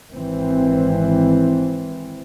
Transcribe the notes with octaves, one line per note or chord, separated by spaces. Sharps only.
G#1 E3 C4